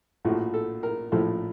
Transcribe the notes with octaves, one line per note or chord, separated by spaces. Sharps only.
A#1 A2 F3 A3 F#4
A4
A#4
A#1 A2 F3 A3 A4